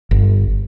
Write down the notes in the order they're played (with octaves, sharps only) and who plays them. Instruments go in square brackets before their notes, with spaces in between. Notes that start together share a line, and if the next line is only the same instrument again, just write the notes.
[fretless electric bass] G1